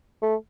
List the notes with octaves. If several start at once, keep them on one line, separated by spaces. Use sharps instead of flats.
A3